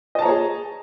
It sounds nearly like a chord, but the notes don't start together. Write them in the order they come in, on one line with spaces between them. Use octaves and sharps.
D#5 A5 A#5 C#5 G#4